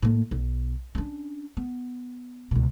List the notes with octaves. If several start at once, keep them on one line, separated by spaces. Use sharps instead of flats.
A2 A#3
B1
C#4 D4
B3
C#2 B2